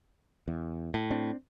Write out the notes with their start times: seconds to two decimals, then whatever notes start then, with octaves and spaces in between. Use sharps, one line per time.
0.48 E2
0.94 A2
1.10 C4 D4